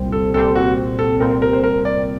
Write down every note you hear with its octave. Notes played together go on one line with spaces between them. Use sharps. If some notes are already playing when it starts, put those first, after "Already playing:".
Already playing: C2 A#2 G3 C4
A4
C2 A#2 G3 C4 A4
F#4
A4
C2 A#2 G3 C4 A#4
A#4
C5
A#4
D5